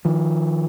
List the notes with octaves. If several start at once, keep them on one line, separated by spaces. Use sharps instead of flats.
D#3 F3